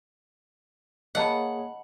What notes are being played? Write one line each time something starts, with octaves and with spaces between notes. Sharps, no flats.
A#3 G#4 C#5 D#5 F#5 A5 B5